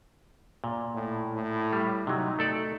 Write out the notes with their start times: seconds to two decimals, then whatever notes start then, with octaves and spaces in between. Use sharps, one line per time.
0.64 A#2
0.94 A2
1.33 A2
1.73 G3
2.07 C3 F#3 D#4
2.39 A3 A4 D5